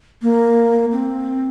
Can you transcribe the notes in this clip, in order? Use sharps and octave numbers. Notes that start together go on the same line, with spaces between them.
A#3
C4